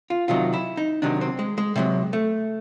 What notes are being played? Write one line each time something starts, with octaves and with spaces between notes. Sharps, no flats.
F4
C3 D#3 F#3 F4
E4
D#4
C3 D#3 F#3 D4
C4
G#3
G#3
C3 D#3 F#3 G#3
A3